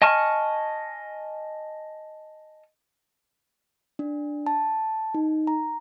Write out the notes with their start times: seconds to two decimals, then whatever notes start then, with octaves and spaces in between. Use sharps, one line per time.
0.02 D#5 G#5 A5 C#6 F6
3.99 D4
4.46 A5
5.14 D#4
5.47 A#5